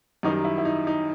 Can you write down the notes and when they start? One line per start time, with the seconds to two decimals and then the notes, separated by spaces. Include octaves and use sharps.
0.23 F#2 D#3 G3 D#4
0.45 E4
0.58 E4
0.65 D#4
0.87 D#4